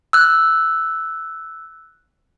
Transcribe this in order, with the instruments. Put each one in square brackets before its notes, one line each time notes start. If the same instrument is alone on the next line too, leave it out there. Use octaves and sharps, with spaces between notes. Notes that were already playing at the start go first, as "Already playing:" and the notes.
[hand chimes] E6 F#6